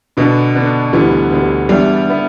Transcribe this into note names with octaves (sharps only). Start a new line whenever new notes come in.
B2 D3 B3 D4
D3 B3 D4
D2 D3 E3 G3 B3
D2 D3 G3 B3
E2 D3 G3 B3 E4
D3 B3 E4